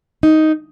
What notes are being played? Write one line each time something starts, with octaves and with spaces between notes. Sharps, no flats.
D#4